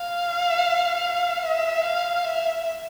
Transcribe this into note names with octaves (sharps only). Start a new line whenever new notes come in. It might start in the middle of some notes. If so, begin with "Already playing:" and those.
Already playing: F5
E5
F5
E5